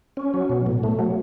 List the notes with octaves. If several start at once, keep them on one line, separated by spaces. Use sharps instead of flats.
C#4
F#3
B2
A2
A3
F#3